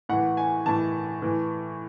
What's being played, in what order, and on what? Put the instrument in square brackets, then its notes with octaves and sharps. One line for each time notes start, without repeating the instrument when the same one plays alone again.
[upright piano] A2 E3 F#5
G#5
A2 E3 A5
A2 E3